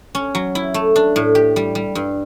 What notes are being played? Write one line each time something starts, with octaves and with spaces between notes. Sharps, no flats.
C#4
F#3
E4
A3
D4
A2
G4
G3
G3
G2